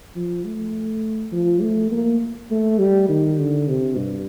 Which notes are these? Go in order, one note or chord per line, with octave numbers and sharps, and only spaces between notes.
F3
A3
F3
A3
A#3
A3
G3
D#3
D3
C3
G2